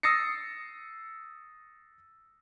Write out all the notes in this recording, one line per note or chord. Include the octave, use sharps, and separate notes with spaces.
D#6 E6 A6 A#6 C7 C#7